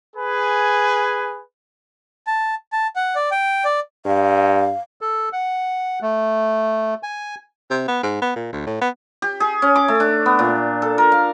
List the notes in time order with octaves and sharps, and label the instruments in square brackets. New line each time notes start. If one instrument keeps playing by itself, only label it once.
[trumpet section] G#4 B4 G#5
[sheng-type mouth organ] A5
A5
F#5
D5
G5
D5
[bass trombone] G2 [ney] F5
[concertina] A4
F#5
A3
G#5
[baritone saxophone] C3
B3
G#2
B3
A#2
D2
A2
B3
[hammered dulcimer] G4
G#4
C#4
D6
A3
D4
B3
A#2
A4
A#4
F5